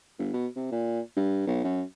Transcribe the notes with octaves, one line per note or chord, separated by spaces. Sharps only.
G1
B2
C3
A#2
G2
B1
F#2